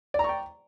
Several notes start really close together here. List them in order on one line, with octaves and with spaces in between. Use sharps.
D5 A#5 C#6 G5